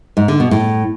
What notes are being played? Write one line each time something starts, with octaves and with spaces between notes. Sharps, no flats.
G#2
D3
B2
A2